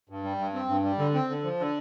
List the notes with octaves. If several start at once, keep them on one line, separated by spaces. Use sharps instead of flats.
G2
G3
G2
C4
G2
G3
D3
C4
D3
F3
D3